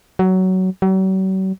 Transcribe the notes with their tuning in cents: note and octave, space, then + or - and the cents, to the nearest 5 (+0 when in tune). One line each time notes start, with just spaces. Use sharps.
F#3 +15
F#3 +45